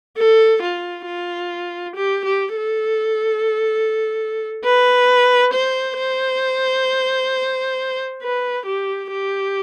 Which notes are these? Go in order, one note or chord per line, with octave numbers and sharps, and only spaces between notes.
A4
F4
F4
G4
G4
A4
B4
C5
C5
B4
G4
G4